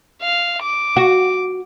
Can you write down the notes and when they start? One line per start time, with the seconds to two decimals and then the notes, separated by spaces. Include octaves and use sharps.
0.22 F5
0.62 D6
0.96 F#4